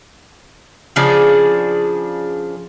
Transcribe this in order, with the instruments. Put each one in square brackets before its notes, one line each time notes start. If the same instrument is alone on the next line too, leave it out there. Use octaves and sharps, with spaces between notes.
[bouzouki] C#3 F3 D4 G#4